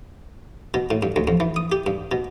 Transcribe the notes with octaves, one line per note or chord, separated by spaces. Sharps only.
B2
A2
G2
D2
F2
E3
D#6
G4
G2
B2